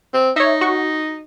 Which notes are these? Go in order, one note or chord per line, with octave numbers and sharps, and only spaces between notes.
C4
D#4 C#5 E5
F#4 C#6